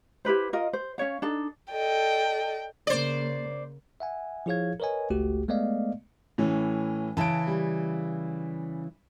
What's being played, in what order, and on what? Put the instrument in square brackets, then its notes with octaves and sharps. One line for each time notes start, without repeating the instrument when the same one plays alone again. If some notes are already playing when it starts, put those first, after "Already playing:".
[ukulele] E4 G4 B4 C5
F4 A#4 D#5
C5
C#4 D#4 C#5 F5
D4 D#4 A4
[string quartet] A4 D5 D#5 [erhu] G5
[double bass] C#3 A#3 [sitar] C5 D5
[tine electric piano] E5 F#5 G#5
F3 E4 G#4 C#5 F5 G#6
A#4 B4 C#5 D#5 G#5
G1 C#2 A3 F#4 G4
G#3 A3 B3 D5 D#5 F5
[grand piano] A2 E3 C#4
[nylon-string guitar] C#3 E3 [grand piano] A5 D7
[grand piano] G3